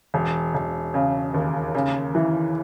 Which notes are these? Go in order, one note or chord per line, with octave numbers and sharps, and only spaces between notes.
E1
E1
C#3
D#2
C#3
E3